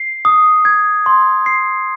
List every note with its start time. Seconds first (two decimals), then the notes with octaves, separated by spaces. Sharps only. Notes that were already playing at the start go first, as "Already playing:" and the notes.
Already playing: C7
0.25 D#6
0.65 G#6
1.06 C6
1.46 C7